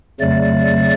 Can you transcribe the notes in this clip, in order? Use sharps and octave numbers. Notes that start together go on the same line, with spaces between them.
F2 C#3 F#3 A3 D5 A6